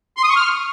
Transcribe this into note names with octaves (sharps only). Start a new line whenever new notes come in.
C6
D#6
C#6
F6